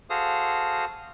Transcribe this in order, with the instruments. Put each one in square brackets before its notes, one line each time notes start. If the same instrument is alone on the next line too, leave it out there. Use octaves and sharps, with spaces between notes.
[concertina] F#4 G#4 A4 C5 F5 D#6